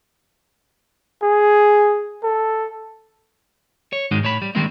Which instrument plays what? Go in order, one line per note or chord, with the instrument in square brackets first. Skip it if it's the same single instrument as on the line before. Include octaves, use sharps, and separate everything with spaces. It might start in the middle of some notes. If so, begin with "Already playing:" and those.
[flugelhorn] G#4
A4
[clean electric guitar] C#5
G#2 D#3 G#3 D#4 F#4
A2 C#5 A5 B5
G3
D#3 G3 G#3 A#3 C4 E4